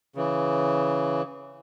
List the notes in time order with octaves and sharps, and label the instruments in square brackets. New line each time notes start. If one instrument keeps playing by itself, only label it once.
[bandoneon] C#3 E3